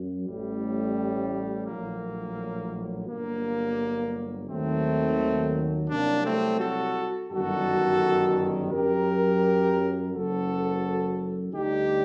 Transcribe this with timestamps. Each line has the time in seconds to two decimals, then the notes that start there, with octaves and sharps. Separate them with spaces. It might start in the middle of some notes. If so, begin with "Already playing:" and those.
Already playing: F#2 F#3
0.25 A1 A2 G3
1.66 A#1 A2 F#3 A#3
3.07 G1 G2 F#3 A#3
4.48 D#2 D#3 F#3 A3 C4
5.89 C2 C3 F#3 A#3 D4
6.24 A3 C4
6.60 F#4 A4
7.30 G1 F#2 D#3 G3 F#4 A4
8.71 F#2 F#3 G4 A#4
10.11 F#1 F#2 F#3 F#4 A4
11.52 D2 D3 G3 D#4 G4